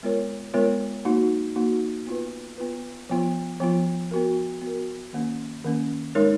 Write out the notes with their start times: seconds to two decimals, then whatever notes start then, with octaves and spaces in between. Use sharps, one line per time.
0.03 G#3 B3 F4 A#4 C#5
0.54 G#3 B3 F4 A#4 C#5
1.05 A#3 D#4 F#4
1.56 A#3 D#4 F#4
2.07 B3 F4 B4
2.58 B3 F4 B4
3.10 F3 B3 F4
3.60 F3 B3 F4
4.11 B3 F#4 A#4
4.62 B3 F#4 A#4
5.13 D#3 A#3 C#4
5.64 D#3 A#3 C#4
6.15 G#3 D#4 A#4 C#5